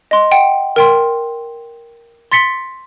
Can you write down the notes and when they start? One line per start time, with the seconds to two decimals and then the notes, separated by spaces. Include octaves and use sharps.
0.11 D#5 C6
0.31 F#5 G5
0.76 A#4 G5 C6
2.32 C6 A6 B6 C#7 G7